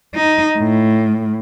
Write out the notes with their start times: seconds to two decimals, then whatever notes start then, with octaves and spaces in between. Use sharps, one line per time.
0.15 D#4
0.59 A2